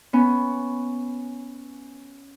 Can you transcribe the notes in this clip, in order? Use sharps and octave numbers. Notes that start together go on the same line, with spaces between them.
B3 C#4